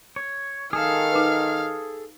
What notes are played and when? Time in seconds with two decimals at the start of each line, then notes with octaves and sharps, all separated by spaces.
0.16 C#5
0.73 D#3 G#4 A4 F5 F6
1.12 D#4 B4